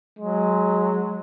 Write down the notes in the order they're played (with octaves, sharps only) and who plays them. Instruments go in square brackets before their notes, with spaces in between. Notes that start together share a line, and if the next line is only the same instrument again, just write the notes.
[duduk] F#3 [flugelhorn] G#3